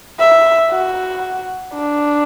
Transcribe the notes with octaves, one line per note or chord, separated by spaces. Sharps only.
E5
F#4
D4